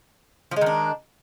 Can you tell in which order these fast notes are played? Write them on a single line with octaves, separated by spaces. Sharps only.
F3 G#3 D#3 D4